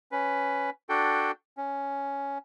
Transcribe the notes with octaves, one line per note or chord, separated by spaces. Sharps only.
C#4 B4
D4 F#4 A4 G5
C#4